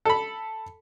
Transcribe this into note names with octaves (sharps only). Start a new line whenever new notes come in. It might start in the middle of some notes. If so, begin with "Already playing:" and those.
A4 B5